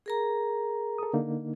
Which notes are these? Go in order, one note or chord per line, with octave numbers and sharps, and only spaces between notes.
G#4 A#4 A#5
A4 D#6
D3 A#3 D#4